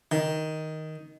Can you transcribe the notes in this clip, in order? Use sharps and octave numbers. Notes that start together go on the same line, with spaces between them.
D#3